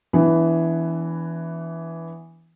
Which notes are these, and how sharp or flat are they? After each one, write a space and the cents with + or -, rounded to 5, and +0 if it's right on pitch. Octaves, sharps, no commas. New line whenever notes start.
E3 +0 B3 +0 D4 -45